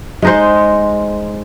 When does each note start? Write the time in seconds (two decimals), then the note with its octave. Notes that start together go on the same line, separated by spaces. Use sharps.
0.22 G#3 D#4 C5